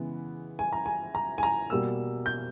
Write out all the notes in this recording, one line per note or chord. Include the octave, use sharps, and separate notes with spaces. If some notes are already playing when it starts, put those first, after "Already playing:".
Already playing: C#3 E3 G#3 B3
G#5
A#5
G#5
A#5
G#5
A#5
B2 G3 A#3 E6
G6